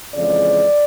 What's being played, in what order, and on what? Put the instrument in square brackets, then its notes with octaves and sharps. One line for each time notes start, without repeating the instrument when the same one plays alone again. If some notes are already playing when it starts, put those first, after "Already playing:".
[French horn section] F2 C#3 E3 G#3 D5